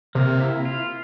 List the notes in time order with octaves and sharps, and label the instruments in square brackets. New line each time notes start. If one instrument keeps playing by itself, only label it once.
[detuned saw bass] C3 [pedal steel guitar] A#3
[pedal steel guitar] E4
F4